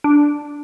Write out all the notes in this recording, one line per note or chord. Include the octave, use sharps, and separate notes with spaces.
D4